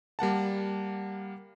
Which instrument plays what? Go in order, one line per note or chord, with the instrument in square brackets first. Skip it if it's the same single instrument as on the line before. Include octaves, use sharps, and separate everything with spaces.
[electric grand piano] G3 A#3 F#5 A5